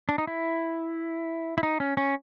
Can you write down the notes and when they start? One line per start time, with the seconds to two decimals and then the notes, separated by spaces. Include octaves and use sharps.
0.09 D4
0.18 D#4
0.27 E4
1.58 E4
1.63 D#4
1.80 C#4
1.97 C#4